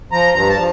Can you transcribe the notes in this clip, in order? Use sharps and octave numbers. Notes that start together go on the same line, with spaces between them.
F3 A#5
G2 A#5
A5
F3